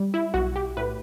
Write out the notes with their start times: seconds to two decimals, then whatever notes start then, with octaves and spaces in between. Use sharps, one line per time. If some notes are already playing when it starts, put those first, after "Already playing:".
Already playing: G3
0.14 E4
0.34 B1 F#4
0.56 G4
0.77 A2 B4